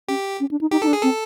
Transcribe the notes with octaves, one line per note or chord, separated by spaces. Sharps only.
C#4 G4
C#4
D4
D#4
D#4 G4
D#4 A4
D4
G#4
C4 A4